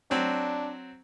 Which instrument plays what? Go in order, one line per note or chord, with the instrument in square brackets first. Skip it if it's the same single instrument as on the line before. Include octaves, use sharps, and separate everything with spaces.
[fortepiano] F#3 C4 [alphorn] D4